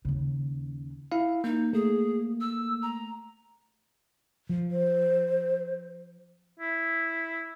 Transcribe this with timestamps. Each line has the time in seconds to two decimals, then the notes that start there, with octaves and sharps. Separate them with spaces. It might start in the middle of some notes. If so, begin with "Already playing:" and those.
0.05 D#2 C#3
1.12 E4 F5
1.44 A#3 D#4
1.73 A3 G#4
2.41 E6
2.82 A#5
4.49 F3
4.70 C5
6.60 E4